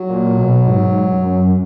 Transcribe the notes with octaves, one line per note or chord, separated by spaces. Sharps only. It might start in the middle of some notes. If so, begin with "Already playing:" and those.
Already playing: F#3
A#2
B2
G#2
F#2